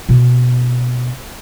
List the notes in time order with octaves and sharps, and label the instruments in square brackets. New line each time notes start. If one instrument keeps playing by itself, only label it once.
[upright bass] B2 B3